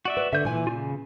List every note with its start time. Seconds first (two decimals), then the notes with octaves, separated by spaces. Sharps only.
0.05 F#4 D5 E5
0.17 B4
0.33 D3 E5 G6
0.45 A#2 E3 G#5
0.67 C#3 F4